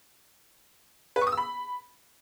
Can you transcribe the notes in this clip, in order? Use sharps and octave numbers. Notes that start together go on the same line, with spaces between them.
B4
C#6
D#6
E6
B5